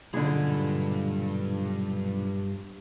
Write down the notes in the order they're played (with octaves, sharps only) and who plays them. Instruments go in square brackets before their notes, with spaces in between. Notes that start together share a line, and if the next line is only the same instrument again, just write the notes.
[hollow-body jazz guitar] B1 A#2 [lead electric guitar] G2 B5 [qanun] D3 G#4